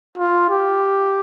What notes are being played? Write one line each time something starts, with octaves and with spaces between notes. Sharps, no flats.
F4
G4